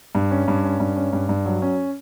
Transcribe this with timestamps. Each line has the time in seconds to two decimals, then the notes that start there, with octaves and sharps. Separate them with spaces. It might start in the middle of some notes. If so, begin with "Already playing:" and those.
0.15 G2
0.31 C#4
0.48 G2
0.64 C#4
0.80 G2
0.96 C#4
1.13 G2
1.29 G2
1.46 F#3
1.62 C#4